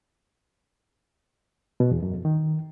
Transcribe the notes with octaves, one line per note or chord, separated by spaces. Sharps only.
B2
E2
F#2
F2
D#3